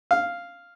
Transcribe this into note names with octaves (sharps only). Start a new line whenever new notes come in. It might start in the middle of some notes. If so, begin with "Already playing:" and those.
F5